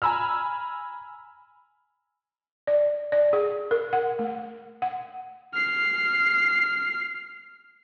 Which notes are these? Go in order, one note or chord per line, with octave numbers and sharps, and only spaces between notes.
G#5 A#5 B5 E6 F6
D5
D5
G#4
A#4
F#5
A3
F#5
F6 C7